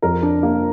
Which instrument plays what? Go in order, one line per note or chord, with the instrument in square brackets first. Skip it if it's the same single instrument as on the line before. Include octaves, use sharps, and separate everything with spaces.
[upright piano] F2 A#4
D4
A#3